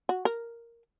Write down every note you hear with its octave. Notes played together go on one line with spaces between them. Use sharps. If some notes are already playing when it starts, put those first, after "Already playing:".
F#4
A#4